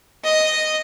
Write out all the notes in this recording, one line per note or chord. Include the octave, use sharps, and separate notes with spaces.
D#5